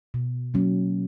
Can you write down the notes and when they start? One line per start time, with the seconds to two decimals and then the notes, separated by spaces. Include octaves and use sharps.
0.14 B2
0.54 F#3 A#3 C#4